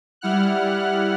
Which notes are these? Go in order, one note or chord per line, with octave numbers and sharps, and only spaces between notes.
G3 E4 F#5 F6 F#6